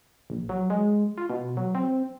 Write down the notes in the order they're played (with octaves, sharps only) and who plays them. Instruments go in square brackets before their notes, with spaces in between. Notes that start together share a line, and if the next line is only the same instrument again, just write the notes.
[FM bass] A#1
F#3
G#3
F4
B2
F#3
C4